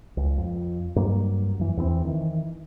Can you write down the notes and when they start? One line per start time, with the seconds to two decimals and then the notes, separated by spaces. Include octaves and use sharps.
0.17 C#2
0.38 F2
0.96 G2 F#3 A#3
1.59 F#2 E3
1.77 E2 E3 B3 C4
2.05 D#3 E3